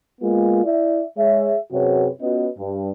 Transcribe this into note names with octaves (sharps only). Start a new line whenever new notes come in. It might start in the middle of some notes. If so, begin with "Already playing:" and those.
G#3 A#3 B3 F4
E4 D5 E5
G#3 G#4 C#5 E5
F#2 C3 F#4 G#4 B4 C#5
B3 C#4 F4 F#4 B4 D#5
G2